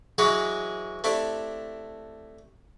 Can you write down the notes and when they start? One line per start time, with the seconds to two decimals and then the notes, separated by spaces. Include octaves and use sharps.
0.18 E3 F#3 G#3 G#4 B4 C#5
1.04 A3 C4 D4 E4 G4